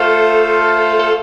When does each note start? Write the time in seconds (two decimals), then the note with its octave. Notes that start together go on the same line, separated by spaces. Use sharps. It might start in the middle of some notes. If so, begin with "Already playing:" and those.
Already playing: A3 F4 A4 C5 F5
0.99 A4